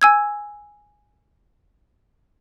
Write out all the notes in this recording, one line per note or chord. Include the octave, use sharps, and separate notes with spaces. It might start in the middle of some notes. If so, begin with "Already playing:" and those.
G#5 E6 G#6